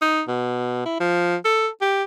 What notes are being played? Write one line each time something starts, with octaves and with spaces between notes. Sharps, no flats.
D#4
B2
E4
F3
A4
G4